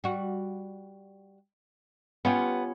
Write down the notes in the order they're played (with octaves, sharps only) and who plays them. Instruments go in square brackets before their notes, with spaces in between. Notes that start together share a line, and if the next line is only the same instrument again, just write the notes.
[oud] G3 F#4
[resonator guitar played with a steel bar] B3 [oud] C#4 F4 G4